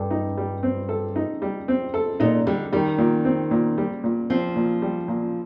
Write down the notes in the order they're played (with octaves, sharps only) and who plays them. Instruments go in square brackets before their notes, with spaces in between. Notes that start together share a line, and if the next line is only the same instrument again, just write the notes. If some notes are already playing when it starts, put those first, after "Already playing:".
Already playing: [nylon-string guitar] G2 [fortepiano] A4
[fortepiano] D#4
G3
C4
A4
D#4
G3
C4
A4
[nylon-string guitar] A#2 [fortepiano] D#4
[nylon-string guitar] D3 [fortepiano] G3
[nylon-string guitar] D#3 [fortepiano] G3
[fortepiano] A#2
C4
A#2
G3
A#2
[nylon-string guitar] F3 [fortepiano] C4
[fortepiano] A#2
G3
A#2